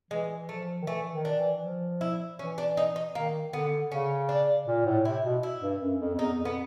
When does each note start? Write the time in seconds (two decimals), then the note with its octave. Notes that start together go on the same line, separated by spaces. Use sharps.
0.11 E3 G#3
0.49 F3 A3
0.82 D#3
0.87 E3 A3
1.13 D#3
1.25 D4
1.38 E3
1.63 F3
2.01 E4
2.39 E3 C#4
2.58 D4
2.77 D#4
2.96 D#4
3.15 D#3 A#3
3.53 D3 B3
3.91 C#3 C#4
4.29 D4
4.68 A#2
4.86 A2
5.05 C3 E4
5.24 B2
5.43 E4
5.62 G2
5.81 F#2
6.01 F2
6.15 F2
6.19 E2 D#4
6.38 F2
6.45 B3